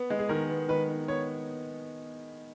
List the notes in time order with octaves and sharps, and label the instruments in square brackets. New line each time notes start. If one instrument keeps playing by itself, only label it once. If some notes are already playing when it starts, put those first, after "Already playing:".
Already playing: [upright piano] B3
G#3
[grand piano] G#4
[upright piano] D#3 [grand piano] A#4
[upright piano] B3
[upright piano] D#3 [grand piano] B4
[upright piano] D#4
[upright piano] B3 [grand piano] C#5